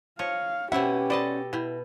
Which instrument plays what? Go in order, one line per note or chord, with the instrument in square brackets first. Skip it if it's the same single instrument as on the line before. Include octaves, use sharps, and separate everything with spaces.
[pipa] F3 [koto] C#5 D#5 [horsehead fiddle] F5
[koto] B2 E4 [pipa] C4 E5 [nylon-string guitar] C#4 F#5 [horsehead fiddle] G4
[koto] A4 D#5 A5 [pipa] C5 D5 B5
[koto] B2 [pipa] E4 G4